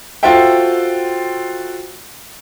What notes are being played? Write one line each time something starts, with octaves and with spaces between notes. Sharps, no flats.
F4 F#4 A4 C5 E5 G5